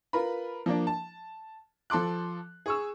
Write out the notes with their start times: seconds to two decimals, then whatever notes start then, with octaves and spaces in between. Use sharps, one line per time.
0.13 F4 A#4 B4 B5
0.66 F3 A#3 D4
0.87 A5
1.90 F3 A4 C6 D6 F#6
2.66 G#4 C#6 E6